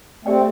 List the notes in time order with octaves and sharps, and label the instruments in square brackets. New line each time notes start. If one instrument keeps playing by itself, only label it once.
[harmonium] A3 C4 [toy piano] G4 D5 G5
[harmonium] A3